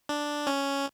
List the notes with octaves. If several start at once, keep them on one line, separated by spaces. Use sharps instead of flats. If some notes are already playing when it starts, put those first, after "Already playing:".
D4
C#4